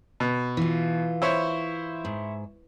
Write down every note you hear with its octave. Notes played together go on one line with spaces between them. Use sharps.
B2
E3 F4
E4 C5 C#5
G#2